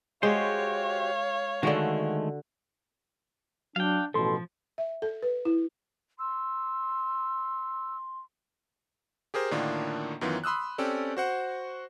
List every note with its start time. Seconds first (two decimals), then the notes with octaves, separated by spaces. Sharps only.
0.23 G#3 F#4 G4 C5 C#5 F5
1.63 D3 D#3 G#3 A3 F#4
3.76 F#3 D4 F5 G5
4.14 A1 B2 F3 A4 C6
4.78 E5
5.02 A4
5.22 B4
5.45 E4
6.19 C6 E6
9.34 G4 G#4 A#4 C5
9.51 A2 D3 D#3 A#3 D4 F4
10.21 F#2 D#3 E3 B3 F4
10.44 B5 C6 D#6 E6 F#6
10.78 C4 C#4 G4 A4 D5
11.17 F#4 C5 F#5